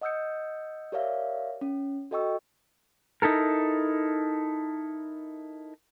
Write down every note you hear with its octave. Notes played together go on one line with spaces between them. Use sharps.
D#5 F#5 D#6 E6 G6 C#7
G4 A#4 C#5 D5 E5 F5
C#4
F#4 A4 D#5 G5 C#6 E6
D#4 E4 A4 A#4